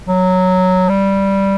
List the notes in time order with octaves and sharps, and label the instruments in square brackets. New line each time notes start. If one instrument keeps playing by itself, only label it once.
[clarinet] F#3
G3